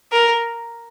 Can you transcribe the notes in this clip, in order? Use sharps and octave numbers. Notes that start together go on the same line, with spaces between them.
A#4